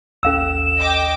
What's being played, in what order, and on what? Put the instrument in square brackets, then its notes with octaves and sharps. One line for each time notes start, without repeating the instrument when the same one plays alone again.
[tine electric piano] A1 D#2 A4 [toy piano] C#4 F5 E6 [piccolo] E7
[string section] D#5 G5 D6